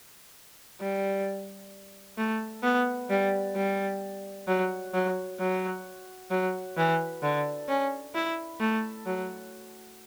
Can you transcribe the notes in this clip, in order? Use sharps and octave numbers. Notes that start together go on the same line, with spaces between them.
G3
A3
B3
G3
G3
F#3
F#3
F#3
F#3
E3
D3
C#4
E4
A3
F#3